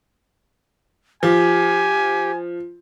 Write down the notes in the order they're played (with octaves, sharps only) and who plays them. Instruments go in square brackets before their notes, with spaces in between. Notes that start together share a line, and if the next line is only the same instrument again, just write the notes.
[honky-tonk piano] F3 [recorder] G4 [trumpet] G#5